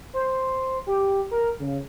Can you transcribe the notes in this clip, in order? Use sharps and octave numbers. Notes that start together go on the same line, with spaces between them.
C5
G4
A#4
C#3